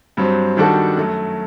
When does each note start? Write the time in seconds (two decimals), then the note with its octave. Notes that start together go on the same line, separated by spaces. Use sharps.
0.17 G2 F#3 C4
0.57 D#3 G3 D4 F#4 A4
0.97 F#2 F#3 A3